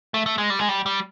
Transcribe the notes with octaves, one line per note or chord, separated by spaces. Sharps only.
A3
A3
G#3
G3
G#3
G3
G3